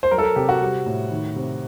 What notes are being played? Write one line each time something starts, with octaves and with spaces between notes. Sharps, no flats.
C5
F#3 A#4
A4
A#4
C3 G4
F#4
G3
A2
D#3
C3